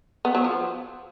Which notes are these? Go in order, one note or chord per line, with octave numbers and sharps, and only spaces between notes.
B3
F#3
F3